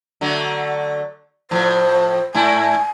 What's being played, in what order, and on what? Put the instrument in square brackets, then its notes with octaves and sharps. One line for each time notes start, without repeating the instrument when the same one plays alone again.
[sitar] D3 F#3 A3
[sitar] A2 F3 [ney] C5
[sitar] G#2 A3 E4 [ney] G#5